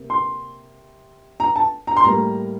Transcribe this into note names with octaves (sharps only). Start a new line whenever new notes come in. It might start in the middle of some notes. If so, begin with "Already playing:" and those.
Already playing: C3 A#3
C6
A#5
A5
A#5
C6
A2 G3 A#3 A#5